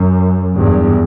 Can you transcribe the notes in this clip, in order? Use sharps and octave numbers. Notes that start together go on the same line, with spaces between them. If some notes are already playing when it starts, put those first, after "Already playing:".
Already playing: F#2
E2 G2